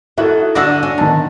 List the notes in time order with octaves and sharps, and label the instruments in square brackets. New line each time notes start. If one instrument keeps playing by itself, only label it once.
[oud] D#3 F#4 [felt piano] E4 A4
[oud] D3 D4 F#4 [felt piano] E6 A#6
[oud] C#4
[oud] D2 [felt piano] D#3 A5